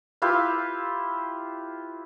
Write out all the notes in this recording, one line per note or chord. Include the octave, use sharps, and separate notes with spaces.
E4 F4 G4 B4